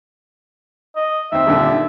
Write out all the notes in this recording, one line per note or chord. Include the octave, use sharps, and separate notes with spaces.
D#5
D#2 C4 E5
D#1 A#2 D3
D#3